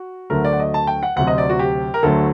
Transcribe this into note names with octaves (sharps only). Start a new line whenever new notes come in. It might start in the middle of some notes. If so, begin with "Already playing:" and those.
Already playing: F#4
D2 D3 F#3 A3 A#4
D5
F#5
D#5
A5
G5
F#5
D2 C3 F#3 F#5
D#5
D5
F#4
G4
A#4
D2 D3 F#3 A3 A4